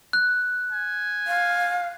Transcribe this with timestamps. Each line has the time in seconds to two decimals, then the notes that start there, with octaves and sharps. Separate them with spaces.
0.13 F#6
0.72 G#5
1.27 F5